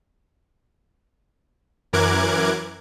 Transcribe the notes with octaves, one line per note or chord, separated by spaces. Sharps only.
F#2 E3 A#4 D6 F#6 G#6